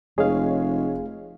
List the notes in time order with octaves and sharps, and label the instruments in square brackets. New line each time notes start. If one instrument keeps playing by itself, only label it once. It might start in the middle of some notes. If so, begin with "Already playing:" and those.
[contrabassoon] F1 [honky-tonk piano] G#3 C#5 [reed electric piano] G#4 F5